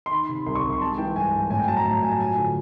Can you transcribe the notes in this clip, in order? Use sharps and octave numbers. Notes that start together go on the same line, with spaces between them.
C6
D#3 B5
C3
C2 C6
C#6
C2
C6
G#3 A5
E3 G5
G2 G#5
G2
A2 G#5
G5
F#3 A5
A#5
A2 A5
F#3 G#5
A5
F3 G#5
D3